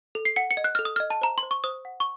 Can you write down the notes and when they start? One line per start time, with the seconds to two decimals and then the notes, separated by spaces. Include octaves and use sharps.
0.15 A4
0.25 C7
0.36 F#5 C#7
0.51 C#7
0.57 D#5
0.64 F#6
0.75 A4 F6
0.85 D#6
0.96 D#5 F6
1.10 A5
1.22 C5 A#5
1.38 C6
1.43 C5
1.51 C#6
1.64 C5 D#6
1.85 F#5
2.00 C#6